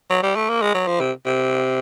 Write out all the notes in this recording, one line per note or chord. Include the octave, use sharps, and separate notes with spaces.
F#3
G3
A3
A#3
G#3
F#3
F3
C3
C3